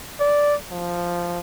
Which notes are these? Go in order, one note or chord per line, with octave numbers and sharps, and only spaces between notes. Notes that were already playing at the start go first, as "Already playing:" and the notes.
D5
F3